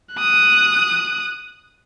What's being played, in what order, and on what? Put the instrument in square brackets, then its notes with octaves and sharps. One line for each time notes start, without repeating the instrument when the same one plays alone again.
[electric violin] D#6 F#6